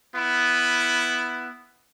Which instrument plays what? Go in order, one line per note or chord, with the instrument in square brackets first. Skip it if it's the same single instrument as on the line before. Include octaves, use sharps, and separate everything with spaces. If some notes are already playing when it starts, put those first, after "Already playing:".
[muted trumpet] B3 [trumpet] E4